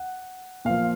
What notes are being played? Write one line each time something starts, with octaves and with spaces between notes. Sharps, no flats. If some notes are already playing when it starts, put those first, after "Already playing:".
Already playing: F#5
A#2 F3 F5